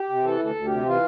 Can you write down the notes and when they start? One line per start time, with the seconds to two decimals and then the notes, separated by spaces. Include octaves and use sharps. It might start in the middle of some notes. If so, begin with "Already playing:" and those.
Already playing: G4
0.09 C3
0.24 E3 A4
0.39 D2
0.44 A4
0.55 D2
0.66 C3 G4
0.86 E3 F4